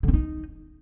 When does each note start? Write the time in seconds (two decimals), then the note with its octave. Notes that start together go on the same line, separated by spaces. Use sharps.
0.03 D3
0.08 C#4
0.13 D#4